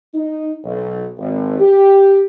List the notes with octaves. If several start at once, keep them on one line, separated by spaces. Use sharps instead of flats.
D#4
B1
G#1
G4